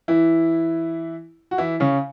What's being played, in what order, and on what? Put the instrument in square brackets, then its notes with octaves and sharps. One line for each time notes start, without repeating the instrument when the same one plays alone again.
[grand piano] E3 E4
F#4
E3 E4
C#3 C#4